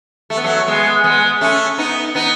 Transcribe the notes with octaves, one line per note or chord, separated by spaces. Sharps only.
A3
B3
F#3 A3
G#3 B3
G#3 B3
A3 C#4
B3 D#4
B3 D#4